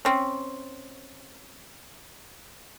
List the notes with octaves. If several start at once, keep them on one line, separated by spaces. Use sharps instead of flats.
C4 C#4